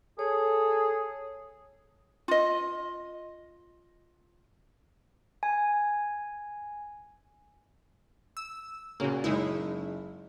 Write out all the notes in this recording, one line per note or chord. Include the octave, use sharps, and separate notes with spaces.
G#4 A4 C#5
F4 D#5
G#5
E6
A#2 C#3 A#3 C#4 F#4
F#1 G#3 D#4 E4